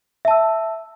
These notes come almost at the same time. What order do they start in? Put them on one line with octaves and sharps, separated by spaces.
E5 A5 E6